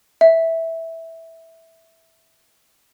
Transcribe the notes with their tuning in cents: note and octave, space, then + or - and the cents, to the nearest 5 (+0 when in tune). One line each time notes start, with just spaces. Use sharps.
E5 -10